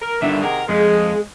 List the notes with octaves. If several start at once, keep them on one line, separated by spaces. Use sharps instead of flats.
A#4
G2 D3 D#3 E5
C3 D#3 G#4 A#4 F#5
F2 G#3 G#4